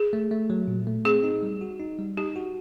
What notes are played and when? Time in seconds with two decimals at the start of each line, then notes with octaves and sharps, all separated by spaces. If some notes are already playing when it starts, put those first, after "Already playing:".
Already playing: G#4
0.13 A3
0.31 A3
0.50 F#3
0.68 A#2
0.87 A3
1.05 C4 G#4
1.23 D#4
1.43 G3
1.61 F#4
1.80 D#4
1.99 G3
2.17 D#4 G4
2.36 F#4